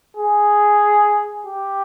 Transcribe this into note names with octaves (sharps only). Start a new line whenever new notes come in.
G#4
G4